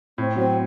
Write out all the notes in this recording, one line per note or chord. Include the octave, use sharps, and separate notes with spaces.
A2 C4
F#3 C4